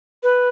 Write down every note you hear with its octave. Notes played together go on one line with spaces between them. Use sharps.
B4